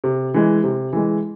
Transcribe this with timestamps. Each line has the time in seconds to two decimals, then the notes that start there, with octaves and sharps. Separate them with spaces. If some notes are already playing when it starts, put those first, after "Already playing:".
0.04 C3
0.34 E3 G#3
0.64 C3
0.93 E3 G#3